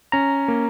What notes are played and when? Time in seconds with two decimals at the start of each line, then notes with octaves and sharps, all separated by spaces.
0.12 C#4 A#5
0.48 A#3